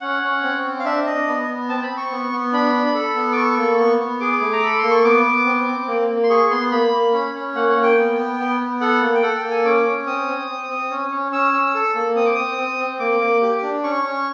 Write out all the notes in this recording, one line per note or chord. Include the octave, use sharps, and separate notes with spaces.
C#4 F#5
C#4
C4
C4
F5
D4 E5
D4 D#5
B3
B3
C4 A5
B5
C4
C#6
B3
B3
D4 B5
D4
A4
B3
D6
A4 C#6
A#3
B3
B3
G#4 D6
A3
A#5
A4 B5
A#3 C6
C#6
B3 D6
B3
C4
C4
A#3
A#3
C6
G#4 C#6
B3 C6
A#3 B5
A#3
C#4
C#4
A#3 F#5
F#5
A#3
G5
B3
B3
B3
B3
A4 F#5
A#3
G5
A4 F#5
G5
A#3
G#5
C#4 D6
C#4
C4 D#6
C4
C4
C4
C#4
C#4
C#4 E6
C#4
A4
A#3
C4 D#6
D6
C4 D#6
C4
C4
A#3 D6
A#3
G4
D4
C#4 C#6
C#4